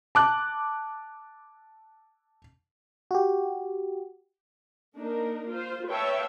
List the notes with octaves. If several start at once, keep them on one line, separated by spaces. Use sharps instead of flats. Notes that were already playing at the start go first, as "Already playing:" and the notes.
A5 D6 F#6
F#4 G4
A#3 D4 D#4 A#4
F4 C5
B4 C#5 E5 F5 G5 A5